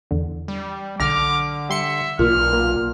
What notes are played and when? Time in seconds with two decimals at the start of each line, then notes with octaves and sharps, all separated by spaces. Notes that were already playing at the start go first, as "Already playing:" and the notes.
0.11 E2 D3
0.48 G3
1.00 B1 D3 D6 F6 A#6
1.69 G3 E5 C6 C#7
2.19 B1 A#2 F6
2.53 A#3